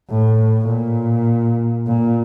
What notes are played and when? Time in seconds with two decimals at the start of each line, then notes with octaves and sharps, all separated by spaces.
0.10 A2
0.68 A#2
1.87 A#2